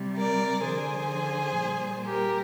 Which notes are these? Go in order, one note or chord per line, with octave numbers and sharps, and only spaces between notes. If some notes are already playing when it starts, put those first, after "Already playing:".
Already playing: C3 G3
A#4 D5
D3 F3 G#4 C5
A#2 G3
G4 A#4